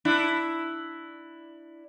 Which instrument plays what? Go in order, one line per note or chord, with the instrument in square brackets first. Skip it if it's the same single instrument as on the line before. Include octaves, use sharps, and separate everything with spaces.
[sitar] D4 E4